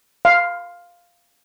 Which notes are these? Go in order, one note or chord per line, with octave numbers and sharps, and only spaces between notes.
F5